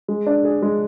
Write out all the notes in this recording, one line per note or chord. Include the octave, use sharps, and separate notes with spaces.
G#3
D4
G#4
G#3